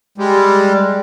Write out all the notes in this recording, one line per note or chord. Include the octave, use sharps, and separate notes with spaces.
G3 G#3